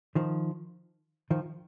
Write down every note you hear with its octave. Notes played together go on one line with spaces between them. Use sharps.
D#3 F3
D#3 F3